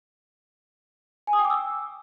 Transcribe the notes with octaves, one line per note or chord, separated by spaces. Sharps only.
G#5
D#6
G5
D6
E6